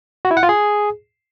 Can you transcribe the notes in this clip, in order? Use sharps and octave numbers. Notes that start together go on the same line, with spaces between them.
F#4
E4
F#5
F4
G#4